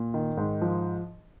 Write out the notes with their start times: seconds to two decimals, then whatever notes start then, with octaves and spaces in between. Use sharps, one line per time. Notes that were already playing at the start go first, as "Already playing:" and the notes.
Already playing: A#2
0.14 D#3
0.37 G#2
0.62 F3